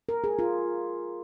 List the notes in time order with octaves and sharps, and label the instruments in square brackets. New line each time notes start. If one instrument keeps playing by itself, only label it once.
[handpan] A#4
G#4
F4